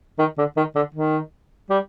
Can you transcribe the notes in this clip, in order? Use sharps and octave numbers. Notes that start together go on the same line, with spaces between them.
D#3
D3
D#3
D3
D#3
G3